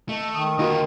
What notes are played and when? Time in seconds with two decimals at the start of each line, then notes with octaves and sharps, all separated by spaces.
0.09 A3 D#5
0.34 D#3 D#6
0.59 D3 A#3 D#4 F4 F#4